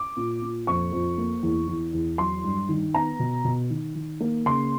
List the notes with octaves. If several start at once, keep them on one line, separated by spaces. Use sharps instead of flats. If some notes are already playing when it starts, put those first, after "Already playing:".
Already playing: D6
A#2
A#2
F2 C#6
F2
A#3
E2
E2
E2
F#3 C6
G2
D#3
B3 A#5
B2
B2
D#3
D#3
A#3
C#3 C6